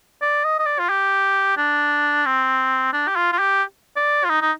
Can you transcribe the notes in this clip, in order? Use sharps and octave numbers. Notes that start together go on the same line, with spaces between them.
D5
D#5
D#5
D5
F4
G4
D4
C4
D4
G4
F4
F4
G4
D5
F4
D#4
D#4